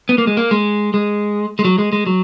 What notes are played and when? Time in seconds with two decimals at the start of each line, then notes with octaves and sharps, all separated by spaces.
0.09 B3
0.18 A#3
0.27 G#3
0.37 A#3
0.51 G#3
0.94 G#3
1.59 G#3
1.65 F#3
1.78 G#3
1.93 G#3
2.06 F#3